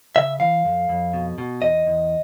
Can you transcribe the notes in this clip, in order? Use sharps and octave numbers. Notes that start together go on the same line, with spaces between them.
C#3 E5
E3 F5
F2
F2
B2
B2
E2 D#5
E2